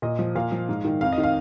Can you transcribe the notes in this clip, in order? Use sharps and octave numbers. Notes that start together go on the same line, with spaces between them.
A#2 D#5
F3
A#2 F5
F3
G#2
D#3
F2 F5
D#5
D#3
F5